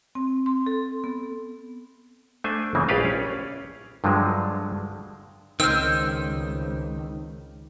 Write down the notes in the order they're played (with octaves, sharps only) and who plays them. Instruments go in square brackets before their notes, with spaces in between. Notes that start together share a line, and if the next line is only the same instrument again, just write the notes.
[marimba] C4
C6
A4
B3
[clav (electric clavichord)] A3 D4 C5 D5 G#5
F#2 C#3 E3 A#3 C4
A#1 G4 G#4 B4 D5 F5
C#4
G2 D3 F3 F#3 G#3
[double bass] C#2 [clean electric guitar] D#3 [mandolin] C4 [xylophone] E6 F6